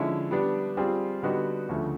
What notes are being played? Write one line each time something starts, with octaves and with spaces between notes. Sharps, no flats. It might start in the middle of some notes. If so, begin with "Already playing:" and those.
Already playing: D3 F3 G#3 C#4 E4
G3 B3 D4
G3 C4 F4 G#4
D3 G3 B3 D#4 F#4
D2 C#3 F3 A3